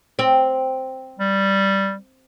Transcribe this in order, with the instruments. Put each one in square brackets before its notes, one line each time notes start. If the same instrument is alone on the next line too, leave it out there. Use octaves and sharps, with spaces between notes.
[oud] C4
[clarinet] G3